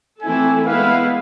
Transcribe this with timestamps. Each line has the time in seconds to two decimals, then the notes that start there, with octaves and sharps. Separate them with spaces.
0.22 E3 A3 C4 E4 A4 G#5
0.66 G#3 B3 E4 B4 F5